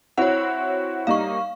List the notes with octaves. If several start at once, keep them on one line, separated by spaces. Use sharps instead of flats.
C4 E4 F#4 C#5 F#5
G3 A#3 D#4 F5 C#6